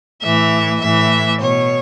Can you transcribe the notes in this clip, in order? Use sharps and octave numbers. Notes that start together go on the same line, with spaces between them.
A2 E3 E5
A2 E3 E5
B2 C#5